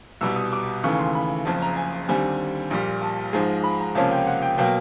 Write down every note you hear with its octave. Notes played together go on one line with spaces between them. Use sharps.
C2 B2 G3 E6
D#6
D6
D#2 C#3 E3 A3 C#6
C6
B5
F#1 F2 C#3 A5
A#5
G#5
D#2 D3 G3 C4 G#5
A#1 A#2 G3
A5
G#2 F3 G#3 G#5
B5
A#5
C#2 C3 F3 A#3 C#4 A5
G5
F#5
G5
B2 F#3 A#3 G5